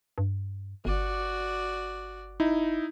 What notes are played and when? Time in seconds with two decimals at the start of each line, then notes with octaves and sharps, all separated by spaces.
0.18 G2
0.85 G1 F#4 D5
2.40 D#4 E4